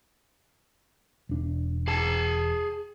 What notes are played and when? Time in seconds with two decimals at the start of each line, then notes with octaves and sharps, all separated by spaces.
1.29 E1 D4
1.88 G#4 A5